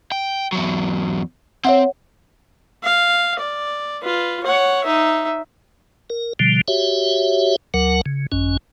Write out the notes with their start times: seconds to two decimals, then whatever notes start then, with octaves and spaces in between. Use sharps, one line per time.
0.12 G5
0.53 E2 F#3
1.65 C4 C#5 E5 F#5
2.83 F5
3.39 D5
4.03 F4 B4
4.43 C#5 F#5
4.84 D#4 E5
6.10 A#4
6.39 B2 D3 F3 G3
6.68 F#4 G4 C#5 E5
7.74 D2 F#3 A#4 F#5
8.06 C#3
8.32 G#1 F#2 C#4